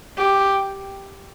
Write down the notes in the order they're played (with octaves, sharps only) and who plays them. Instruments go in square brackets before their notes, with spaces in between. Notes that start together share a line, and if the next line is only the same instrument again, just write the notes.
[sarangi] G4